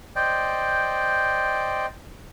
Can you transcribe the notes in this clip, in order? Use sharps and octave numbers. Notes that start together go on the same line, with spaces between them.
C5 D5 D#5 G5